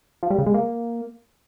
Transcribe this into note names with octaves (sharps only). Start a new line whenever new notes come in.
F3
G3
C#3
G#3
A#3